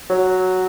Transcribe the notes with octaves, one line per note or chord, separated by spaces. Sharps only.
F#3